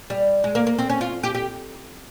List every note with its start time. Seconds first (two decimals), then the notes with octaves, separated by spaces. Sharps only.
0.10 G3
0.44 G#3
0.55 A#3
0.67 A#3
0.78 C4
0.90 C#4
1.01 F4
1.23 G4
1.35 G4